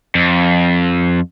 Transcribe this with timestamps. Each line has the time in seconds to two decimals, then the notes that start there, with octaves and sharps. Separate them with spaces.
0.15 F2